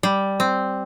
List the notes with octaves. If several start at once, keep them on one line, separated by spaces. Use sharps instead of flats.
G3
C4